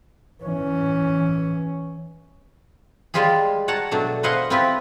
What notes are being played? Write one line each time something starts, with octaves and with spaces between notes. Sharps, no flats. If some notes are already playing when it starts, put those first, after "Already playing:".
E3 C#4
G3 G#3 F4 G4 G#4
C#5 F#5 A5 A#5
B2 F#3 A3 D4
B4 C5 D#5 F5 F#5 G#5
C4 E4 F4 G4 B4